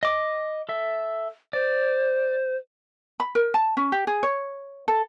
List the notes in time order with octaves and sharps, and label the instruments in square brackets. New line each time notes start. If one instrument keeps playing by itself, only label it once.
[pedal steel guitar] D#5 D6
A4 E5
[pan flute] C5 [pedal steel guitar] D5
[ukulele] B5
A#4
A5
C#4
G4
G#4
C#5
A4